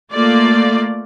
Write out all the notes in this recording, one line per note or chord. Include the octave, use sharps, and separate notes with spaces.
A3 A#3 F4 D5